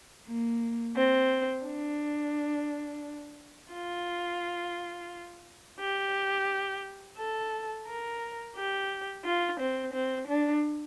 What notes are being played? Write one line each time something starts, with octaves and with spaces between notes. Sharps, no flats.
A#3
C4
D4
F4
G4
A4
A#4
G4
F4
C4
C4
D4